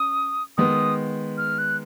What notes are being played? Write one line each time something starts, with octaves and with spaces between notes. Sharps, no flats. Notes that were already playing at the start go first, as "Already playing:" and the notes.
Already playing: C#4 D#6
D#3 G#3 B3 D#6
F6
F#6